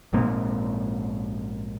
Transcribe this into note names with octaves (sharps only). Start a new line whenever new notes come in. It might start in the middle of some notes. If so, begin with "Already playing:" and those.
A#1 G#2 A#3 C4